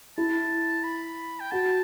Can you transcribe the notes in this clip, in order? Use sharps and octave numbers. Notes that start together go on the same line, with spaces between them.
E4 A5
B5
G5
F#4 A5